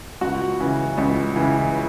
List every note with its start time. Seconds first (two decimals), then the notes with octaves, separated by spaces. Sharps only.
0.21 C#2 F#4
0.60 C#3 E3
0.98 C#2
1.36 C#3 E3